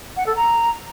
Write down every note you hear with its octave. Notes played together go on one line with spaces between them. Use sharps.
F#5
A4
A#5